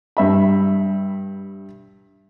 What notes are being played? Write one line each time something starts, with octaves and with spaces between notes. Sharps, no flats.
G2 E5 B5